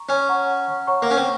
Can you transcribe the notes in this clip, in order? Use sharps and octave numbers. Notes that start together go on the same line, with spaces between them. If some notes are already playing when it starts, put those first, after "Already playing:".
Already playing: A#5 C#6
C#4
C#5 F#5 A#5 C#6
C#5 F#5 A#5 C#6
A#3
C#4
C4